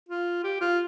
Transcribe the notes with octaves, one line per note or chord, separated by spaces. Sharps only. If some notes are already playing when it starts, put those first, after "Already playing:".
F4
G4
F4